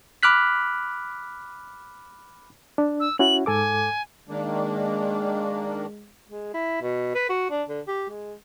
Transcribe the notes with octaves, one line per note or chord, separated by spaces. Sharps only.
B5 D6 F6 F#6 B6
D4
E6
C#4 E4 F#4 F#7
G#2 A4 G#5 D6
D#3 G#3 A#3 D4
G#3
E4
B2
B4
F#4
D4
D3
G4
G#3